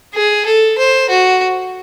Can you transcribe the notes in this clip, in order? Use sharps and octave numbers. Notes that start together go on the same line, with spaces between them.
G#4
A4
C5
F#4